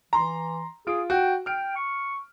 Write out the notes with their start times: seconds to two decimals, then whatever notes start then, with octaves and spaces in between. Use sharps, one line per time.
0.13 E3 A#5 C6
0.87 F4 G#4 D7
1.10 F#4 G5
1.46 G5 F6 D7
1.76 C#6